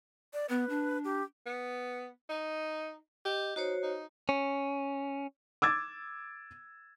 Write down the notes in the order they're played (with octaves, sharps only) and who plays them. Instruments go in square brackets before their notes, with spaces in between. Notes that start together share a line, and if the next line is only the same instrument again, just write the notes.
[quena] D5
[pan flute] B3 [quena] B4
[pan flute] D4
[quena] G4
[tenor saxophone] B3
D#4
[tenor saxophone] G4 [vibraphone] D#5
[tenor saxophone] D#4 [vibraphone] F#4 C5 C#5
[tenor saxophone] D#4
[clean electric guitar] C#4
[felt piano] D6 E6 G#6 A6